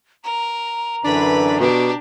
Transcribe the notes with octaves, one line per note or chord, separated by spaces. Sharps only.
A#4 A#5
F#2 D3 E3 D4 B4 B5
B2 D4 G4